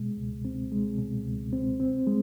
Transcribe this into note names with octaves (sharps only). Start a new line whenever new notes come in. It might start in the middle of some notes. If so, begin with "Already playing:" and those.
Already playing: B2 G#3
C#2
C4
G#3
B2
C#2
C4
C4
G#3